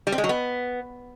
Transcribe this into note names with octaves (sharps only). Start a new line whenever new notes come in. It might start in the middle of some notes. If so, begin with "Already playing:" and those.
G3
C4
G#3
F#3
B3